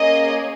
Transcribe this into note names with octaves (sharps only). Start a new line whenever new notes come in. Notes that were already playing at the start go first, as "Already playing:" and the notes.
Already playing: A#3 C#4 G#4 D#5